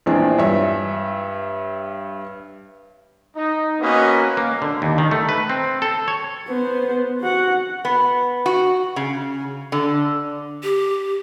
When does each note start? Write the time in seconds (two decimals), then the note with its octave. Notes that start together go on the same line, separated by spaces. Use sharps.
0.06 A#1 E2 G#3 C4 D4
0.38 G2 C#5 E5
3.37 D#4
3.81 A#3 B3 C#4 F#4 B4 D#5
4.37 A#3
4.62 D3
4.82 D#2
4.98 D#3
5.11 A3
5.29 B4
5.49 C4
5.82 A4
6.08 C#5
6.48 B3 C5
7.21 F#4 F#5
7.85 B3
8.46 F#4
8.96 C#3
9.72 D3
10.63 G4